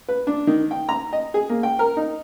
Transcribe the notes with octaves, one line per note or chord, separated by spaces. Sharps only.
B4
D4
D#3
G5
A#5
D#5
G#4
A#3
G5
A#4
D#4